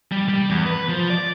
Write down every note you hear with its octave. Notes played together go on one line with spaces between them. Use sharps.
G3
G3
E2
B4
F3
D5